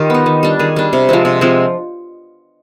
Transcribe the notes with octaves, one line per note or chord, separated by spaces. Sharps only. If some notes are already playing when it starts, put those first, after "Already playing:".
Already playing: D#3 F4 G4
B3 D#4
D#3
G3 D4
D#3 G#4
G3 D4
C3
F3 G#3 C4
C3
F3 G#3 C4